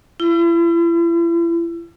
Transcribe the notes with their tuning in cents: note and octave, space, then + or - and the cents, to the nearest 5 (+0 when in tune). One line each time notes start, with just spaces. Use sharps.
E4 +40